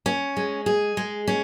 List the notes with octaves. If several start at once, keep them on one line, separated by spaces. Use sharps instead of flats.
C#4
G#3
G#4
G#3
C#4